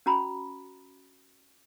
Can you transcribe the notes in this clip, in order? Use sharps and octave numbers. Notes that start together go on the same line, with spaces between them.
C#4 F#4 A#5 B5